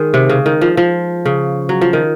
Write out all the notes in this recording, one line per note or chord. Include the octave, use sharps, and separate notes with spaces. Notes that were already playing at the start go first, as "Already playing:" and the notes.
Already playing: D#3 G#3
C3
C#3
D#3
F3
F3
C#3
F#3
F3
D#3